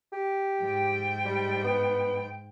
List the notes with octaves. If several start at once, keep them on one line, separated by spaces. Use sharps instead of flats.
G4
G#2 G5
G3
B3